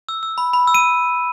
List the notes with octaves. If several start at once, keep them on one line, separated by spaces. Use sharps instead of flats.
E6
E6
B5
B5
E6
D#7